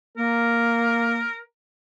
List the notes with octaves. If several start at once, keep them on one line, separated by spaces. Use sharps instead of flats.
A#3 A#4